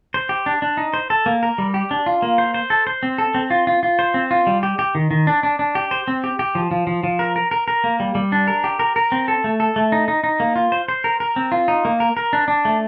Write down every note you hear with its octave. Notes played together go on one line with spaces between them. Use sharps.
C5
G4
D4
D4
D#4
C5
A4
A#3
A#4
G3
G4
D4
F4
A#3
C5
C5
A4
C5
C4
A4
C4
F4
F4
F4
C5
C4
F4
G3
G4
G4
D#3
D#3
D4
D4
D4
G4
C5
C4
G4
G4
F3
F3
F3
F3
A#4
A#4
A#4
A#4
A#3
G3
G3
D4
A#4
G4
A#4
A#4
C4
A4
A3
A4
A3
D#4
D#4
D#4
A#3
F4
C5
C5
A#4
A#4
C4
F4
D#4
A#3
A#4
A#4
D4
D4
A3